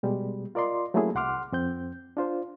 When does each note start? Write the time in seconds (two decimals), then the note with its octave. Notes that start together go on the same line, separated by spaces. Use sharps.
0.03 B2 G3 G#3
0.55 F4 A#4 D5 D#5 C6
0.94 F#3 A3 A#3 C#4 E4 G#4
1.15 C2 F#5 C6 D6 F6
1.52 F2 C4 G6
2.17 D4 F4 C5